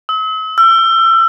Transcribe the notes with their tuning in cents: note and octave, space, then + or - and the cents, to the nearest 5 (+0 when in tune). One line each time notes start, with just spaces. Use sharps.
E6 -45
E6 +30